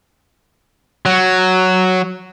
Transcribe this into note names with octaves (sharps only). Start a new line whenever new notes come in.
F#3